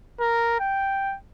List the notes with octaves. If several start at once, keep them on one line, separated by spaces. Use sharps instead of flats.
A#4
G5